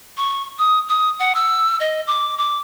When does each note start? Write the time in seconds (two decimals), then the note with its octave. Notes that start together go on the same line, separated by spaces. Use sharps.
0.17 C#6
0.58 D#6
0.88 D#6
1.19 F#5
1.35 E6
1.80 D#5
2.07 D6
2.37 D6